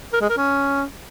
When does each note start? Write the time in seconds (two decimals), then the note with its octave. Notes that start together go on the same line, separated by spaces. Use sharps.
0.13 A#4
0.21 G#3
0.29 A#4
0.37 C#4